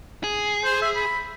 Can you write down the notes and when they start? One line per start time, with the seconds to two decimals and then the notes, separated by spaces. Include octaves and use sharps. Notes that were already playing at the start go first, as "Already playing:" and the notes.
0.24 G#4
0.64 C5
0.82 E5
0.95 B5